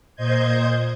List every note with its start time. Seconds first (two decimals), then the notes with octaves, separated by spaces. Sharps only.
0.16 A#2 C5 D#5 G6 G#6